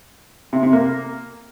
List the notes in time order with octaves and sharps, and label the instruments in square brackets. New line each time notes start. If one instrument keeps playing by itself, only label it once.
[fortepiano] C3
C3
A#3